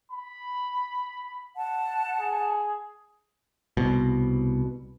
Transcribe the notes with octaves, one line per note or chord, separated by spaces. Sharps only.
B5
F#5 A5
G#4
C2 B2